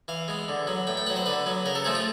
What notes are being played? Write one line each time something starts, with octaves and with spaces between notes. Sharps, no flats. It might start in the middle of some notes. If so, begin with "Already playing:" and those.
E3 F5
G#3 B3
D3
F#3 B3
A2 G5
G5
F#3 B3 F#5
C5
D3 B4
F#3 B3
C#3 A#4
A4
F3 A3 C4 G#4
F4